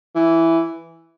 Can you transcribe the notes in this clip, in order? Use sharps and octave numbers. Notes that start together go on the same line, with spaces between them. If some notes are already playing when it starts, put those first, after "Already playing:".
E3